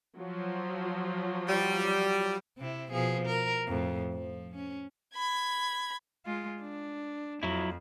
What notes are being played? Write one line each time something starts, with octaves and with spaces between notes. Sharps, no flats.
F3 F#3
G3
C3 C4 E4
B2 F3 G#4
A#4
F2 A2
F3
C#4
B5 G#6
G#3 F4
D4
F2 F#3 E4